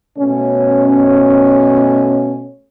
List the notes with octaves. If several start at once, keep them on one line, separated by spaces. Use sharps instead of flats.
B2 A3 C#4